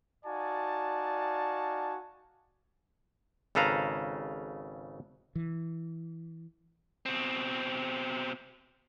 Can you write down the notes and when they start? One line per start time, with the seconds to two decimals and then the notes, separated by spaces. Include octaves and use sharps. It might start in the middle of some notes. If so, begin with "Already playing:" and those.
0.25 D#4 F#4 D5 F5 G#5 A5
3.55 G#1 C#3 A4 B4 F5 A#5
5.35 E3
7.06 B2 C4